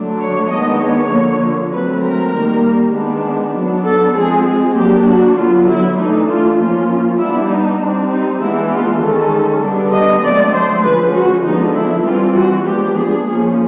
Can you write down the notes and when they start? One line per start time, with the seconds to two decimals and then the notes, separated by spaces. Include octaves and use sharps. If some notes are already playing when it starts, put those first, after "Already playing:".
Already playing: D3 F#3 A3 D4
0.20 C#5
0.50 D#3 G#3 B3 D4 D#5
0.81 C#5
1.11 D3 F3 A#3
1.71 F#3 A3 C4 B4
2.02 A#4
2.33 D#3 G3 A#3
2.93 D#3 G#3 B3 D4
3.54 F#3 B3 D4
3.84 A4
4.15 F3 G#3 C4 G#4
4.45 G#4
4.75 F#3 A#3 D4 G4
5.06 F#4
5.36 D3 F#3 B3 F4
5.67 E4
5.97 E3 A3 D4 D#4
6.27 F4
6.57 F3 A#3 C#4 F4
7.18 G3 B3 D4 E4
7.49 D#4
7.79 G3 C4 D4
8.09 D#4
8.40 E3 G#3 B3 D4 E4
8.70 F4
9.00 D#3 G#3 C#4 A4
9.61 D3 G3 B3 D4
9.92 D#5
10.22 D3 F#3 A3 C4 D5
10.53 C5
10.83 D3 F3 G#3 C#4 B4
11.13 F#4
11.43 D3 F3 G#3 B3 D4 D#4
11.74 E4
12.04 E3 G3 C4 F4
12.35 F#4
12.65 F3 G#3 B3 D4 G4
12.95 G#4
13.26 F3 A#3 C#4